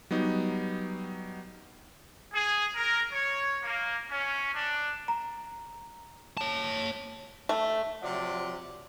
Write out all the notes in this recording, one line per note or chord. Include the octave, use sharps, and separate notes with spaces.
F#3 G3 B3 D#4
G#4
A#4
C#5
A#3
C#4
D4
A#5
C#5 A5
A3
C3 F3 F#3 F#4 D5